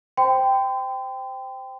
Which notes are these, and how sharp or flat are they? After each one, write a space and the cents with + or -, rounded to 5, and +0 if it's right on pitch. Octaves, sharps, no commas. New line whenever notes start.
C5 +0 G5 +0 C6 -40